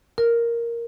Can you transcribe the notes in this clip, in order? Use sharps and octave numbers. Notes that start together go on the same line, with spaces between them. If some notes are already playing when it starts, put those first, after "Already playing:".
A#4